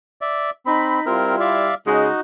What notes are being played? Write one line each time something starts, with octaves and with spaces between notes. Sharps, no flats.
D5 E5
C4 D#4 B5
G3 C4 E4 F4 A#4
D5 E5 F5
C#3 G#3 D#4 F#4